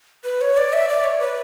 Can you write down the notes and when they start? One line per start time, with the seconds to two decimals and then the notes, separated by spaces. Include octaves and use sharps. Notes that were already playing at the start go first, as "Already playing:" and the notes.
0.24 B4
0.41 C#5
0.57 D5
0.73 E5
0.88 D5
1.04 C#5
1.20 B4